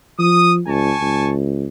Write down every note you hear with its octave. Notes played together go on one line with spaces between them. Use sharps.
F3 D#6
C#2 G#5 A5 C#6
C#2